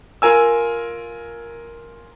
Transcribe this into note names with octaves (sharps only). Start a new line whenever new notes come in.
F4 A#4 G#5 E6